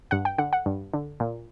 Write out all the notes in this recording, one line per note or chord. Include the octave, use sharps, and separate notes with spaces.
G2 F#5
G5
D3 F#5
F#5
G2
D3
A#2